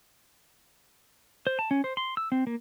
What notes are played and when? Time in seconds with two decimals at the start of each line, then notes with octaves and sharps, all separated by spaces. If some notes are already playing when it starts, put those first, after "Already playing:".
1.47 C5
1.59 A5
1.71 C#4
1.84 C5
1.97 C6
2.17 E6
2.32 C4
2.47 A#3